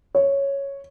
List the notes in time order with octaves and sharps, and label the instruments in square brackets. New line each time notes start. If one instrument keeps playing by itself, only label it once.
[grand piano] C#5